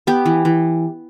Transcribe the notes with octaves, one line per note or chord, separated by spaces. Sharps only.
B3 G4
E3
E3